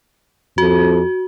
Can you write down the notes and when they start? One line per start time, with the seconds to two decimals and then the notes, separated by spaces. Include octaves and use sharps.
0.58 F2 F#4